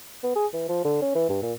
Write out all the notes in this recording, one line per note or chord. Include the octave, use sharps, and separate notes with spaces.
B3
G#4
E3
F3
D3
C#4
E3
G2
A#2